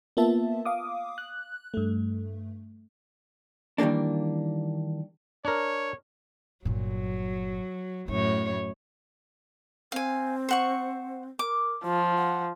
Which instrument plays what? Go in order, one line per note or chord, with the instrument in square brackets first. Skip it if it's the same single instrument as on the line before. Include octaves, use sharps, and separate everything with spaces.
[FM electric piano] A#3 B3 F4 E5 A5
F5 D6 D#6
F#6
G2 A3
[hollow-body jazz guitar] D#3 E3 G3 A#3 D4
[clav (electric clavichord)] D4 A#4 [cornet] C#5
[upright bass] G1 A#2 [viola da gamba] F#3
[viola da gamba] F#2 A2 C#5 [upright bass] E4
[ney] C4 [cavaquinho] F5 G#5
[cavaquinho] C5 F#5 C#6
[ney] A#4 [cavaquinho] D6
[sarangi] F3 [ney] F4
[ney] F#5